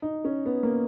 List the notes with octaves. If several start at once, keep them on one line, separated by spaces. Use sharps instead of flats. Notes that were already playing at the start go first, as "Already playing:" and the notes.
D#4
C#4
B3
A#3